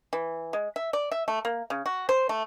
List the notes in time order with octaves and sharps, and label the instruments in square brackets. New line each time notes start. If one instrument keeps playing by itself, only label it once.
[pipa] E3
G#3
E5
D5
E5
A3
A#3
C#3
F#4
C5
A3